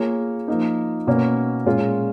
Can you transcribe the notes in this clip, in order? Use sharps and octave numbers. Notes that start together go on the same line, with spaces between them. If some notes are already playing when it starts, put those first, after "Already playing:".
Already playing: A#3 F4 G#4 C#5
F3 A#3 D#4
B2 A#3 C#4
A#2 G#3 C#4 F4